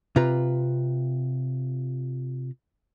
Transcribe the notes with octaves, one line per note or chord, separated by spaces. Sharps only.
C3 F4 B4 A#5